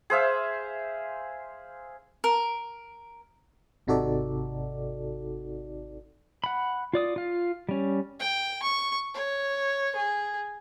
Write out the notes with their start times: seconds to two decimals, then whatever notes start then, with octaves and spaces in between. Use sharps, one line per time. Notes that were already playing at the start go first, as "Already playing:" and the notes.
0.10 G#4 C5 E5 F5
2.24 A#4
3.87 G#1 C3 D#4 F#4 A4 D5
6.44 F#5 B5
6.93 F4 D5 D#6
7.16 F4 F5
7.69 G3 C#4
8.20 G5
8.63 C#6
9.15 C#5
9.96 G#4